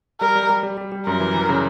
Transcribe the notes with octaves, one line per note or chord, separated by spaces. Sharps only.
G3 A#4
G3
G3
G3
G3
G3
F#2 A#4
E3
E3
C#3